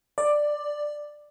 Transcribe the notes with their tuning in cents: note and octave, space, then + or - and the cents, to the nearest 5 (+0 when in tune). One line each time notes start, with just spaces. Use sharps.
D5 +10